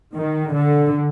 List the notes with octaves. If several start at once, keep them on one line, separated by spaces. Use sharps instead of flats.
D#3
D3